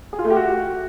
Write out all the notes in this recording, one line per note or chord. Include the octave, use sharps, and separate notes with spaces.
G#4
F4
A3
G4
F#4